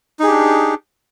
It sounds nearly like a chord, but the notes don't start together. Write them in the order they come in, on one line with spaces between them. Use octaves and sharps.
D#4 G#4 G4 D4